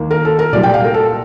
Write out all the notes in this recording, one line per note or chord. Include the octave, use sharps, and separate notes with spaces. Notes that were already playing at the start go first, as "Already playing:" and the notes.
Already playing: D#2 D#3 A#3
A#4
A4
A#4
C2 A#2 G3 D5
G5
F5
A#4
A4